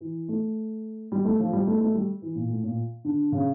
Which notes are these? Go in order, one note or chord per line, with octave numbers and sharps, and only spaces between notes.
E3
A3
G3
A3
F3
G3
A3
A3
G3
E3
A#2
A2
A#2
D3
C#3